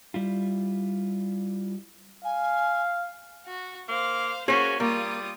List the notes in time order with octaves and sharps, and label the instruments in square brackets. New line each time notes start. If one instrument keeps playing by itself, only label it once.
[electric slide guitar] G3 E4 F4
[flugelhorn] F5 [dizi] G#5
[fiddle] F#4
[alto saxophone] A#3 [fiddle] C5 F5
[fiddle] A#3 F#4 [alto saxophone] C#4 [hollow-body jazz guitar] G#4 C5
[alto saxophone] G3 [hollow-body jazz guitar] A#3 [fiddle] F4 D#6